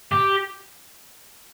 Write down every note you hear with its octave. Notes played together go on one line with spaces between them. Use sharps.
G4